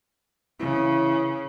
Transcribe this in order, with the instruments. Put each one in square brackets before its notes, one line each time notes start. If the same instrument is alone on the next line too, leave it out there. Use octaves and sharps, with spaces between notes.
[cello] C#3 [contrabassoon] E3